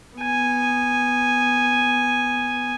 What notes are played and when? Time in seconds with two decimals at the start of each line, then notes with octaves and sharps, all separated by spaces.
0.18 B3 G#5